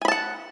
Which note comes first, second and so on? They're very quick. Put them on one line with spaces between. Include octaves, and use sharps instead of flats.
G#5 B5 A5 F#5